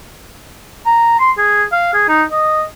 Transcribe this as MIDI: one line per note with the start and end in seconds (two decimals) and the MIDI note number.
0.86 1.17 82
1.19 1.30 84
1.38 1.64 68
1.72 1.93 77
1.93 2.06 68
2.08 2.23 63
2.31 2.62 75